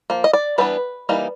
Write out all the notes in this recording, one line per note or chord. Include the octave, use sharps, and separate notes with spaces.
F3 A#3
D#5
D5
E3 G3 B3 D4 B4
E3 G3 A#3 D#4